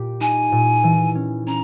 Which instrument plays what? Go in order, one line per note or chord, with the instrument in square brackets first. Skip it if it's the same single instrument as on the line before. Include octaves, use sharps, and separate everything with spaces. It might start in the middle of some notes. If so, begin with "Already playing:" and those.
Already playing: [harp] A#2 G4
[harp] D#4 [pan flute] G#5
[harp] A#2
E3
C#4
[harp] C#4 [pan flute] A#5